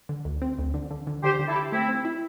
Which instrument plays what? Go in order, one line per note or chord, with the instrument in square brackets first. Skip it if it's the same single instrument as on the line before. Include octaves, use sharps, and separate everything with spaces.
[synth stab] D3
D2
C4
D2
D3
D3
D3
[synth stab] D3 [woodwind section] G4 C5
[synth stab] D3
[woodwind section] E4 A4
[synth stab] G4
[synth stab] A3 [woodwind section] C4 E4
[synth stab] C4
E4